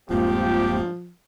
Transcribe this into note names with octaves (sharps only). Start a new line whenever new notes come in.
D#1 G2 F3 G#3 A#3 C4 F4 G4